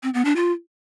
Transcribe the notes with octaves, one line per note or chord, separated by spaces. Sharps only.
C4
B3
D4
F4